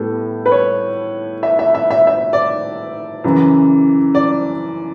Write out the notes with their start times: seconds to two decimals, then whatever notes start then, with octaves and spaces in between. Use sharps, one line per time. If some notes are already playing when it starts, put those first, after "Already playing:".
Already playing: A2 G3 B3 A4
0.46 B4
0.52 C#5
1.43 E5
1.59 E5
1.75 E5
1.91 E5
2.07 E5
2.33 D5
3.24 F#2 C#3 E3
4.15 D5